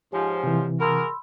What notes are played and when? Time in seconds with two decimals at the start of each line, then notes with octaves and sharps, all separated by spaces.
0.12 G#2 F3 G4 C#5 G#5
0.44 C3 E3
0.80 F#4 G#4 A#4 B5 C6 E6